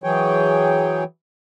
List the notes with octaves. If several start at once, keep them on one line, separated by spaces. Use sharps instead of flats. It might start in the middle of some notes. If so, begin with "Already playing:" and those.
E3 F#3 G#4 C#5 G5